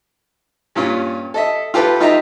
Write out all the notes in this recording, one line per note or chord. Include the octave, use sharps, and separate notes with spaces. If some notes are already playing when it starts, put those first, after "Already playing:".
G2 A#2 C#4 F4
A4 D#5 E5
F4 G4 A4 B4
D#4 F4 G4 D#5 E5 A#5